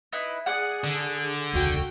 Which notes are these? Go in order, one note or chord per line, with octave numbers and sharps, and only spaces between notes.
D#4 E4 B4
G#4 D5 F#5
D3
E1 C#2 F#4 G5